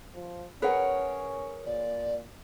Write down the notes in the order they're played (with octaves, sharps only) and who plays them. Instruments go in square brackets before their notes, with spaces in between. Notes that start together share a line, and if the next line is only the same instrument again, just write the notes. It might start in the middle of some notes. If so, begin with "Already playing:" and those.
[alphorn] F3
[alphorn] C#4 [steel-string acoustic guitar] G#4 A#4 C#5 [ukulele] B4 F#5
[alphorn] A#2 [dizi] D5